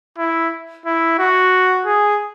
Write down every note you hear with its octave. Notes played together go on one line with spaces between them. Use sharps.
E4
E4
F#4
G#4